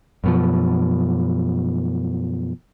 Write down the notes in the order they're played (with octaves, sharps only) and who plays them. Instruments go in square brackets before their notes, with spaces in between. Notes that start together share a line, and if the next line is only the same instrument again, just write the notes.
[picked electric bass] F#2 B2 F3